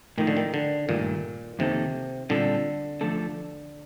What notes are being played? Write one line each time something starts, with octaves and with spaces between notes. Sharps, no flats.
A2 D#3 F3 A3 D#4
D3
D#3
D3
G2 A#2 D#3 A3
F2 C3 D#3 A#3 D#4 A4
A#2 D3 G3 C4 F4 A4
F3 A3 D4 A4